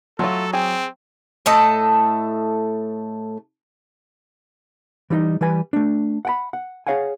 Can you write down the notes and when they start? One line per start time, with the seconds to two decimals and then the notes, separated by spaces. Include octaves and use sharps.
0.19 F#3 A3 F4 A4 C#5 F#5 C6
0.53 C4 G#4 G5
1.46 A2 A3 A4 D#5
5.10 E3 G3 D#4 D#5
5.41 E3 G3 B4 G#5
5.73 A3 D4
6.25 F#5 G5 B5
6.53 F#5
6.87 G#4 C#5 F5 F#5 G#5